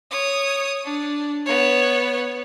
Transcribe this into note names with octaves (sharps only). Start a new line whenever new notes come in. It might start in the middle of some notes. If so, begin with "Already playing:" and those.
C#5 D#6
D4
B3 C#5